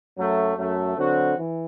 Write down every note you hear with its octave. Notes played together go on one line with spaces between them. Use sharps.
F#2 F#3 A3
F#2 F#3 A3
D3 F#3 C4 F#4
E3